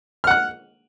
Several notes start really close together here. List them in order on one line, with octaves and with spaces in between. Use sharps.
F6 F#5 F#6